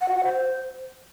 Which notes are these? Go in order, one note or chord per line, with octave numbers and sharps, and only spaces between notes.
F#5
F#4
F#5
C5